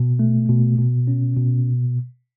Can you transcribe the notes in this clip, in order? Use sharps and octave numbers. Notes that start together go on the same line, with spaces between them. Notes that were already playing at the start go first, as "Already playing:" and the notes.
Already playing: B2
A3
B2
B2
C#4
B2